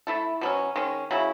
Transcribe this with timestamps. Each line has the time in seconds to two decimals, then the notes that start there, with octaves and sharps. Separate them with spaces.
0.07 A3 E4 A4
0.41 B2 F#3 C#4
0.76 D#3 G#3 C#4
1.11 C#3 F#3 C#4 E4